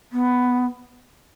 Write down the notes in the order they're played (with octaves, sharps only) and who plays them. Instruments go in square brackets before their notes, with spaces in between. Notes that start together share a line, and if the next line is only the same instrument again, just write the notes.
[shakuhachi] B3